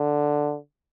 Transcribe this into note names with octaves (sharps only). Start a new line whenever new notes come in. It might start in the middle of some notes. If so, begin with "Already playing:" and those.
Already playing: D3